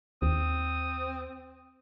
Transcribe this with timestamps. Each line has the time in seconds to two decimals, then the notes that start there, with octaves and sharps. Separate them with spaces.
0.22 D#2 C4 D#6